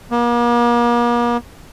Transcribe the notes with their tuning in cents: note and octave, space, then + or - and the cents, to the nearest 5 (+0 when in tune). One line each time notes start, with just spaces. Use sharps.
A#3 +40